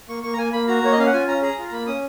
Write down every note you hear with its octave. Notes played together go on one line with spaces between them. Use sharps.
A#3 C#6
A#3 C#6
A#5
A#3 G#5
A#3 B5
F#4 A#5
A#3 C#5
D#5
C#4 F5
F#5
F4 G#5
C#4 A#5
G#4 A#5
F4
A#5
A#3 B5
C#4 D#6